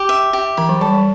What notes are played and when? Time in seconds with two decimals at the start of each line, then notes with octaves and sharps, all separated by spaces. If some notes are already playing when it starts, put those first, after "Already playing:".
Already playing: G4
0.09 E5
0.33 G4
0.57 E3 B5
0.69 F#3
0.81 G3 A4
0.93 G3